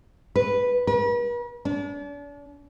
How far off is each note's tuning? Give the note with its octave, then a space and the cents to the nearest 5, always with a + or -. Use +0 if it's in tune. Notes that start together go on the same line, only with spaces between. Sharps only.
B4 -5
B4 -45
D4 -40